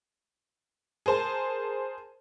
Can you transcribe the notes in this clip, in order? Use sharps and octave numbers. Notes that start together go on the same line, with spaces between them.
G#4 A#4 C5 A5